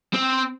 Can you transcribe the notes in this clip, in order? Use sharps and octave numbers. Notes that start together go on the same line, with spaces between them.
C4